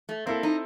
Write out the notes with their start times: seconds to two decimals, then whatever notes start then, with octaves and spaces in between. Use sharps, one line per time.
0.09 A3
0.26 A#3 C4 E4 A4
0.43 D#4